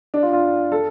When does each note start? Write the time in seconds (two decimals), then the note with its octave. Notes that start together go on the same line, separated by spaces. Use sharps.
0.14 D4
0.23 F4
0.33 F4
0.72 A4